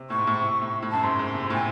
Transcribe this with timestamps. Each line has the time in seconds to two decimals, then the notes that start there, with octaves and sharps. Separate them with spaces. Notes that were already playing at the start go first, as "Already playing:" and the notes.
Already playing: C3
0.10 A2 C#6
0.18 G#2
0.27 A2
0.41 C3
0.61 A2
0.83 A2
0.91 F#2 A5
1.03 G#2 C6
1.19 G#2
1.34 C3
1.50 A2 G#5